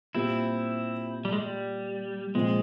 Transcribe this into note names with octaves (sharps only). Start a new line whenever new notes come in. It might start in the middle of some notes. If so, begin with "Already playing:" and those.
A#2 G3 A#3 C4 E4 F4
G3
G#3
G3
A#2 F3 G#3 C4